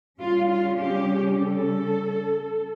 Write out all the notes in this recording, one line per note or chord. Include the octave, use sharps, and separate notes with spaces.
C#3 G3 C#4 F4
F4
G4
A4